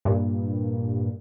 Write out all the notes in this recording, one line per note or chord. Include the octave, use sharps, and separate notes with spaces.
G2 A#2